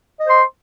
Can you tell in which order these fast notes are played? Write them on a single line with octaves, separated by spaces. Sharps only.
D#5 C5 C6